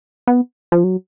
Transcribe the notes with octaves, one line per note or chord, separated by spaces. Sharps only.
B3
F3
F#3